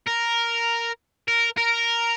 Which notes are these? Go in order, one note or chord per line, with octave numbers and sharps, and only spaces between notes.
A#4
A#4
A#4